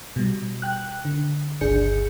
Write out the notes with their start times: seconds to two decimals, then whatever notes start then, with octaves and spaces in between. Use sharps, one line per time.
0.16 B2 G3
0.62 G5 F#6
1.05 D3
1.61 G1 C#2 D4 G#4 G6 C#7